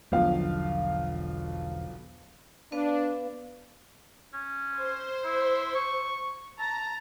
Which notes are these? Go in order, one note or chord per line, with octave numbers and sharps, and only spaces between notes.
E1 B1 D3 F3 F5
B3 D4 B4 F5
C#4
C5
E4
C#6
A5 A#5